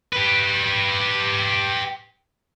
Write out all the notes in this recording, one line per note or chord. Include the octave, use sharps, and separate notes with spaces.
G4 B4